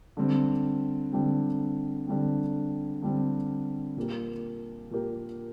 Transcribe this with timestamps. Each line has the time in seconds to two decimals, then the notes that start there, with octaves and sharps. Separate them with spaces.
0.17 D3 G3 C4
1.13 D3 G3 C4
2.07 D3 G3 C4
3.02 D3 G3 C4
3.97 A#2 A#3 G4 A#4
4.91 A#2 A#3 G4 A#4